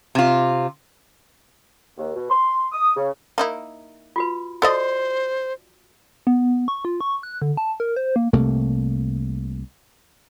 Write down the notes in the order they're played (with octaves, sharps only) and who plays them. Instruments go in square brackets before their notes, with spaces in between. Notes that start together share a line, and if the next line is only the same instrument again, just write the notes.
[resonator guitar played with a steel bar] C3 F4
[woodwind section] D#2
B2
C6
D#6
C#3
[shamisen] A#3 D#4 E4
[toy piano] F4 F#4 B4
[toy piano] F#4 [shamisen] A4 D5 D#5 [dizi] C5
[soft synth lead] B3
C#6
F4
C#6
F#6
D3
A5
A#4
C5
A#3
[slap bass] C2 C3 A3 A#3